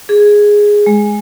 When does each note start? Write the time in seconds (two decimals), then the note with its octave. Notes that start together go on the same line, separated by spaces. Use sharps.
0.09 G#4
0.86 G#3